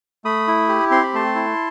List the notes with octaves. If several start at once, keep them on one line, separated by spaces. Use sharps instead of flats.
A3 B5 D#6
E4
G4
C4 C6
B5
A3 A5 C6
E4